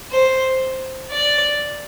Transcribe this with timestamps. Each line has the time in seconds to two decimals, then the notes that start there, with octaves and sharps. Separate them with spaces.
0.12 C5
1.11 D5